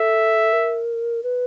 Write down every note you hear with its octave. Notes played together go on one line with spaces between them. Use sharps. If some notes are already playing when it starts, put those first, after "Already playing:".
Already playing: A4 E5
A#4
B4